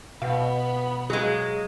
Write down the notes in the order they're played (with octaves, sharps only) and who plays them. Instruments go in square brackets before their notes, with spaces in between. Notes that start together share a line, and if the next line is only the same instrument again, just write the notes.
[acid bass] B2 [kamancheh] B3 B5 [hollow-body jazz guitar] F5
[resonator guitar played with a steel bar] F#3 G#3 [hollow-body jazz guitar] G#4 D#5 F5